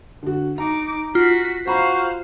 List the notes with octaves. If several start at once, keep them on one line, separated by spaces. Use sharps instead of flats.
D3 F#4
D#4 A#5 D6
F4 F#4 B6
F#4 C5 F5 A#5 B5